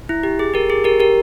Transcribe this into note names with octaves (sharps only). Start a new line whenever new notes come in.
E4
G4
G#4
G4 A#4
G#4
G4 A#4
G4 A#4